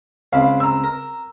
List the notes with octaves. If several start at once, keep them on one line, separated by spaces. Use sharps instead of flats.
C#2 C4 F5 B5
A#5 E6
A#4